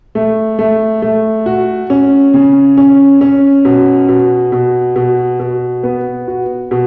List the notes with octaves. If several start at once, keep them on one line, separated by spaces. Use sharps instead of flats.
A3
A3
A3
F#4
C#4
C#3
C#4
C#4
B2
B2
B2
B2
B2
B3
F#4
B2